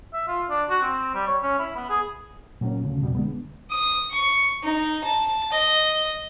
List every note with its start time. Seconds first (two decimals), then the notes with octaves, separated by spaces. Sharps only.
0.13 E5
0.28 F4
0.50 D4
0.70 F#4
0.82 C4
1.15 G3
1.27 C#5
1.42 C#4
1.59 E4
1.76 B3
1.90 G#4
2.61 A#2 F#3 A#3 C#4
2.82 D2 C#3
3.01 C2 F2 B2 G3
3.15 D3 G#3 B3
3.70 D#6
4.11 C#6
4.63 D#4
5.04 A5
5.52 D#5